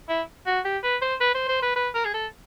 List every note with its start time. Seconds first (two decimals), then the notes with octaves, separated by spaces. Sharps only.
0.09 E4
0.46 F#4
0.65 G4
0.83 B4
1.02 C5
1.20 B4
1.35 C5
1.48 C5
1.62 B4
1.76 B4
1.95 A#4
2.05 G#4
2.13 A4